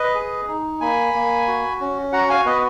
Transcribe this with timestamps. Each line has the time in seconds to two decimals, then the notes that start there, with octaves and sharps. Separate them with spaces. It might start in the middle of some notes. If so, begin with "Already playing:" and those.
Already playing: B4 D#5
0.14 G#4
0.48 D#4
0.81 A#3 G#5 B5
1.14 A#3
1.47 F#4
1.81 C#4
2.12 F#4 F#5 A#5
2.29 F5 G#5
2.46 B3 B4 D#5